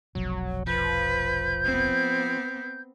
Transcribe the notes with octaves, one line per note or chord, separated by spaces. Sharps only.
F1 B1 F2 F#3
F3 B4 G6
B3 C4